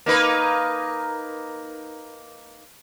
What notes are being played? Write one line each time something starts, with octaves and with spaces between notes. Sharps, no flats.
A#3 D#4 B4